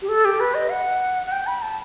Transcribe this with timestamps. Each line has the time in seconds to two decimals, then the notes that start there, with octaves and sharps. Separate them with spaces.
0.02 G4
0.09 A4
0.25 G4
0.40 B4
0.54 D#5
0.71 F#5
1.27 F#5
1.32 G5
1.47 B5
1.62 A5